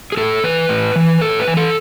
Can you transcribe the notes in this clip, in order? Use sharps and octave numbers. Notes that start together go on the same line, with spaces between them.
G#4
A2 A4
E3 B4
A2
E3
A2 A4
B4
E3
A4